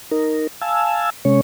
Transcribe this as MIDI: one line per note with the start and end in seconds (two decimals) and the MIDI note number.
0.11 0.47 63
0.11 0.47 70
0.61 1.10 77
0.61 1.10 80
0.61 1.10 81
0.61 1.10 88
1.25 1.41 48
1.25 1.41 56
1.25 1.41 61
1.25 1.41 73